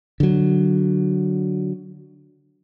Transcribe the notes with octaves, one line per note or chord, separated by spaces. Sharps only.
D3 F#3